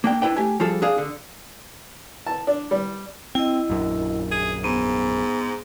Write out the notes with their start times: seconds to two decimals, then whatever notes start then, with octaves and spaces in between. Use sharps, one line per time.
0.04 A#3 D4 G5
0.22 D4 E4 B4 G5
0.37 A3 G4 G#5
0.60 F3 G3 F4 G#4 A4
0.82 D4 G#4 F5
0.98 D3
2.26 A5
2.47 D4
2.71 G3
3.35 C4 E4 D#5
3.70 A#1 F#2
4.32 G#4
4.64 G#2 B3